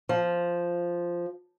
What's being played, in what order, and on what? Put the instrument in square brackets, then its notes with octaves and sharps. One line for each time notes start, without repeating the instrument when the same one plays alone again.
[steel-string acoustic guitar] F3